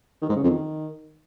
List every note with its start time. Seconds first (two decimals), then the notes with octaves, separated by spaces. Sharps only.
0.22 D#3
0.29 G#2
0.36 C#3
0.43 F2
0.50 D#3